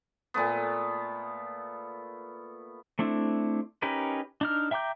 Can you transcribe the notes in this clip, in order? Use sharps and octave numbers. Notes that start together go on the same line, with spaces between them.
A#2 A3 B3
A3 C4 D4 E4
C#4 D#4 G4 A#4 B4
D4 D#4 F6
E5 G5 A#5 D6 G6